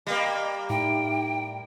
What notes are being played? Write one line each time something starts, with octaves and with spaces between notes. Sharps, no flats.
G3 A#3 D#5 F5
A2 D#4 E5 G5